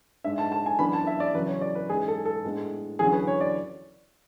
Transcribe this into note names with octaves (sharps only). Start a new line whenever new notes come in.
G#2 G#3 D4 E5
A5
A5
G#5
F#2 E3 B3 D4 B5
A5
E5
D5
E2 C#3 F#3 C#4 B4
C#5
D5
B4
G#2 E3 G#3 C#4 G#4
A4
A4
A2 G#3 B3 D4
E2 D3 F#3 C#4 G#4
B4
C#5
D5